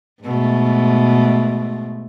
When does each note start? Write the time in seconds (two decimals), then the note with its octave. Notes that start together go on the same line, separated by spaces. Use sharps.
0.23 G#2 B2 A3